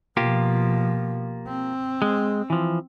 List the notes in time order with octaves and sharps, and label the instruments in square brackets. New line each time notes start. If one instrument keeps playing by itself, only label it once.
[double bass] B2 F3 [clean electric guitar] A#3 F4 G4
[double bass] C4
[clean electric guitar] G#3
E3 F3